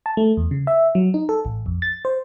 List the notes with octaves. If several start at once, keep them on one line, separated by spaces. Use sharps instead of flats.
A5
A3
E2
C#3
E5
F#3
D#4
A4
A1
F2
A6
C5